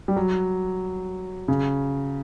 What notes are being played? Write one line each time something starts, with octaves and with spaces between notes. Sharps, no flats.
G3
F#3
C#3